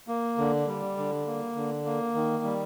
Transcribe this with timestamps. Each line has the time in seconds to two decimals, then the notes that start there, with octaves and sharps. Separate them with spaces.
0.08 A#3
0.38 D3
0.67 G3
0.97 D3
1.27 A#3
1.55 D3
1.85 A#3
2.15 D#3
2.44 G3